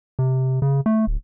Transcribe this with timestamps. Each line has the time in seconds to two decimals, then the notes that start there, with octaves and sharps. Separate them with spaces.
0.19 C3
0.62 C#3
0.86 A3
1.07 D1